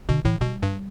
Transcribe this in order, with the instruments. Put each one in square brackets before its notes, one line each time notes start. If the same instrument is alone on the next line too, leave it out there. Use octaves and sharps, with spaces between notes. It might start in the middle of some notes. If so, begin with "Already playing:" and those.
[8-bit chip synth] B2 [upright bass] D3
[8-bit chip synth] A2 [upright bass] E3
[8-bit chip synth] B2 [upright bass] G3
[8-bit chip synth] G2